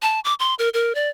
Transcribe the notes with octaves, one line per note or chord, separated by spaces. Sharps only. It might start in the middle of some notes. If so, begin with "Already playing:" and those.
A5
D6
C6
A#4
A#4
D5